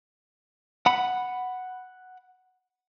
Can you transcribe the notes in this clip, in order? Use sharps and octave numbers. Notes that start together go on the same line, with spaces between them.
F#5 B5